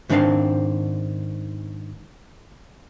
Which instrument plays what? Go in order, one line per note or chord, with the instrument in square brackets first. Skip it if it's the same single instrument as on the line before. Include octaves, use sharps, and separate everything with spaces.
[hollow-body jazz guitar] G#2 D#3 A3 C4 D4 F5